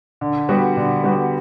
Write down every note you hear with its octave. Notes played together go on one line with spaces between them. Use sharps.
D3
G3 B3 F#4
D3
G3 B3 F#4